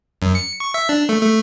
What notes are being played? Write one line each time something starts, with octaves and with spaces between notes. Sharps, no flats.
F#2
C#7
C#6
E5
D4
A3
A3